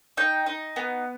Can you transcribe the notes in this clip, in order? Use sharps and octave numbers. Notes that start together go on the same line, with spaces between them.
D#4 G5
D#4
B3